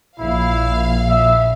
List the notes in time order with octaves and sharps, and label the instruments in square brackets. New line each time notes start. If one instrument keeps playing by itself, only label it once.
[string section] A#1 F5 [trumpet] E4
[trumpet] E5